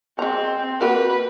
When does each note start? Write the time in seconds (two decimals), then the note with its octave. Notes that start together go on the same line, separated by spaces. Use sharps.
0.19 G#3 C4 A#5
0.81 A#3 F#4 A#4 B4